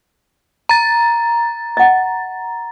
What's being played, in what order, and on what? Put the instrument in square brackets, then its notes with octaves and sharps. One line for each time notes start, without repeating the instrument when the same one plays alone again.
[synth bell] A#5 A6
[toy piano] D#5 F#5